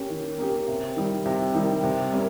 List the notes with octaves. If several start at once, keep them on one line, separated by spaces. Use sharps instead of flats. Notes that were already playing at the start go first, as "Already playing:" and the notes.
Already playing: A#3 C#4 G4
D#3
A#3 C#4 G4
C3
D#3 G3
C3
D#3 G3
C3
G3 A#3 C#4